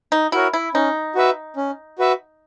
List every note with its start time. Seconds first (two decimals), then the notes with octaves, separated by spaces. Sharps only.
0.12 D#4
0.32 E4 F#4 A#4 C#5
0.53 E4
0.74 C#4 D#4
1.15 F#4 B4 E5
1.56 C#4
1.99 F#4 B4 E5